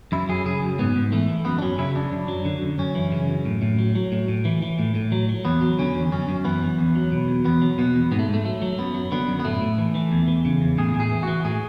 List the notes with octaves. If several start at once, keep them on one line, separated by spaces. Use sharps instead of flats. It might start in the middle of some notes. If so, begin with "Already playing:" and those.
F#2 E4
F#3 G#4
C#3 G#4
F#2
G#2 B3
G#2
E3 A3
E3
F#2 B3
D4
F#3 C#4
C#3 E4
F#2 D4
F#2
F#3
D3
F#2
F#2 C#4
E3
C#3
F#2
A2
A2
F#3
F#3
A2
A2
E3
E3
A2
A2
F#3
F#3
E2 B3
F#3
D3 C#4
E2
F#2 C#4
F#2
E3 B3
E3
E2
F#3
B2
E2
E2 B3
F#3
B2 B3
E2
G#2 B3
A3
G#2
A3
F#3 A3
F#3
F#2 B3
F#3
D3 B3
F#2
B3
A2 A3
A2
E3
E3
E2
E3
C#3
E2
A2 G#4
A2
G#4
E3
E3 F#4
A2 G#4